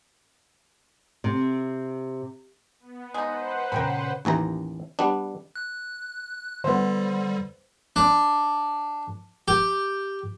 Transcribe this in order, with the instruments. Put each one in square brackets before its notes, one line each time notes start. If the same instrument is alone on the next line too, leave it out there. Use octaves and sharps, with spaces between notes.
[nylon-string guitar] C3
[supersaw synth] B3
[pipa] G#3 D#4 [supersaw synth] B4 C5 F#5
[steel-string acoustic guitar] A#2 C#3 [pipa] A#4 G5 B5
[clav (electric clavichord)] A1 D#2 E3 A#5
G3 B3 D4
[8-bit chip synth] F#6
[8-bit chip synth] D3 G3 [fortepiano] B3 C5
[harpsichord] D4
G4